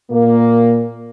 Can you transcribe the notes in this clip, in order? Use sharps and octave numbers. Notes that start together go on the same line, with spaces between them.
A#2 A#3